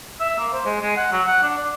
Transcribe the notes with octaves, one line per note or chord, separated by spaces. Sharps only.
E5
A#3
C5
G#3
G#3
F#5
F#3
F#5
D4
D5